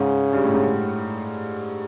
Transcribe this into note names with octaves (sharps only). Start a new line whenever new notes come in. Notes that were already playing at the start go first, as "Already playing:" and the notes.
Already playing: G#2 C#3
G2
A2
G#2